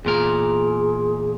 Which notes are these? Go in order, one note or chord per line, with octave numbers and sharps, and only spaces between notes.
E2 A#2 G#4 A#4